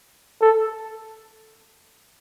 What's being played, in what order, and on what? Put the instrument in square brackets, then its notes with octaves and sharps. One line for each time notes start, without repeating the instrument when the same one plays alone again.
[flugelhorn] A4